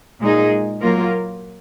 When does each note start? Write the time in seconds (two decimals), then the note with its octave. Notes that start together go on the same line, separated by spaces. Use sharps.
0.21 A#2 G#3 D#4 G#4
0.81 F#3 A#3 F4 A#4